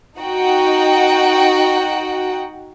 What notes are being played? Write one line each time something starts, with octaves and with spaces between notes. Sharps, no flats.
D#4 F#4 F#5 G5